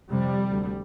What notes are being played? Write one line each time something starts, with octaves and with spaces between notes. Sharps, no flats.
F2 C3 G3
D2